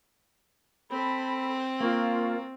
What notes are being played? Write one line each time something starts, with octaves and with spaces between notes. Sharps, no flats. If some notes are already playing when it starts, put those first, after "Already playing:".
C4 A4 B5
A#3 F4 C#6